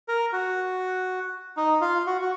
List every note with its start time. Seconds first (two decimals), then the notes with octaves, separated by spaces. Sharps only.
0.08 A#4
0.33 F#4
1.57 D#4
1.81 F4
2.07 F#4
2.21 F#4